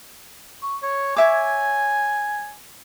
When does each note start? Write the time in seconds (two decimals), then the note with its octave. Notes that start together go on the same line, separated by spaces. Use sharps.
0.63 C#6
0.83 C#5
1.16 C#5 E5 G#5 D6